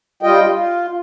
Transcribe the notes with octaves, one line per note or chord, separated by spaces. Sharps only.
G3 F4 D#5 G5
F4